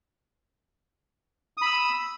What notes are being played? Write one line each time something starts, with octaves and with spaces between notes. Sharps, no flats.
B5 D#6 E6